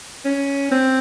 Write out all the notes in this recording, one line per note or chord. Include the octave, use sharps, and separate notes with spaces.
C#4
C4